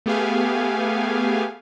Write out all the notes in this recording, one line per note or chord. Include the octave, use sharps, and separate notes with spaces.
A3 B3 G4 G#4 F5 G#5